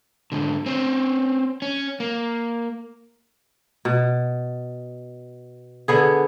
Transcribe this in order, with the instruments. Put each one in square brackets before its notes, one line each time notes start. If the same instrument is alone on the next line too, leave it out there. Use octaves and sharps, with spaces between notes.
[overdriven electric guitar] G#2 D3
C4 C#4
C#4
A#3
[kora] B2
D3 B3 G#4